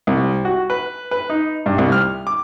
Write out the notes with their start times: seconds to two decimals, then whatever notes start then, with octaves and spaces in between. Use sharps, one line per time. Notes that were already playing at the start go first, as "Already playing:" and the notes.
0.07 C2
0.45 F#4
0.70 B4
1.11 B4
1.30 D#4
1.66 G2
1.78 C2
1.92 F6
2.27 D6